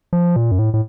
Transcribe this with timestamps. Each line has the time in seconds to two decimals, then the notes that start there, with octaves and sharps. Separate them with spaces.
0.13 F3
0.36 A#2
0.51 F#2
0.59 A2
0.74 A2